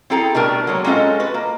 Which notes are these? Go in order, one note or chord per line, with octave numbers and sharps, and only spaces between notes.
C4 E4 G#4 A4 G5 A#5
B2 G3 A3 D4 A#4
F#3 G#3 A#3 C#5
G#3 C4 C#4 F4 A4 D#5
F#4 B4
A#3